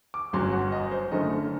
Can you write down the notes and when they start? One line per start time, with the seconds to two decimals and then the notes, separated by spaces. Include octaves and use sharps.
0.14 D6
0.33 G1 F#2 F#3 C6
0.52 F#5
0.72 D#5
0.91 C5
1.12 F#1 F#2 D3 A3 D#5